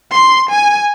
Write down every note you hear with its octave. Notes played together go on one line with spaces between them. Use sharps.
C6
G#5